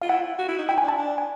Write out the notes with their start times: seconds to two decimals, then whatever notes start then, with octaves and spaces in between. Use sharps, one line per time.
0.02 F4 F5
0.09 E4 F#5
0.39 F#4
0.48 E4
0.58 D#4
0.69 E4 G5
0.78 G#5
0.84 D4
0.88 A5
0.98 D4
1.18 G#5